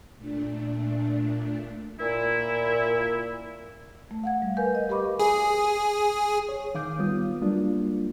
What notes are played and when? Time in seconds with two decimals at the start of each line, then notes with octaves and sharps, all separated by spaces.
0.17 A#2 A3 D4
1.98 A#2 E4
4.11 A3
4.24 F5 F#5 G#6
4.42 G3
4.57 A#4 B4 F5 G#5 G6
4.75 D#5
4.89 G4 A#4 D#5 B5 C#6 D6
5.20 G#4
6.49 C#5
6.75 D#3 F5 D6 G6
6.99 G3 B3 F4 D#6
7.41 F#3 G3 A#3 D4 F4